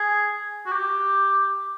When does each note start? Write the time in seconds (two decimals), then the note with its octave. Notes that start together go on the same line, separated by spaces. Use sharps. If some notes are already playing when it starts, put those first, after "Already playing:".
Already playing: G#4
0.66 F#4
0.72 G4